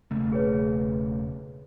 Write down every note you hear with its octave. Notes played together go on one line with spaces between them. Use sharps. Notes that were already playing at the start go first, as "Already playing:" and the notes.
E1 C#3 A3
G#4 B4 C#5